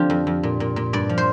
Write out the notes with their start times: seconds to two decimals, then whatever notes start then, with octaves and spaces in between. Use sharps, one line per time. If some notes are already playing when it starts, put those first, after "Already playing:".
Already playing: D3 F3 C4 D4 F4 G4
0.10 F2
0.27 F2
0.43 A#2
0.60 A#2
0.76 A#2
0.93 G2 D5
1.09 F3
1.18 C5